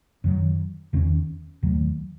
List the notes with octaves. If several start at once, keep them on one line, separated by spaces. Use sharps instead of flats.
F#2 D#3 F#3
E2 D#3 A3 C#4
D#2 D#3 F#3 A3